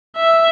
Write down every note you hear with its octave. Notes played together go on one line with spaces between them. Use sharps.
E5